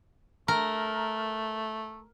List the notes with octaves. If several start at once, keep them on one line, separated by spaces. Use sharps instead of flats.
A3 A#4